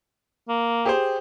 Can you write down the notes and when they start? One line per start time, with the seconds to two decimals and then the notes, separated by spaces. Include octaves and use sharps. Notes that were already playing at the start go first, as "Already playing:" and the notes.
0.49 A#3
0.85 G4 G#4 C5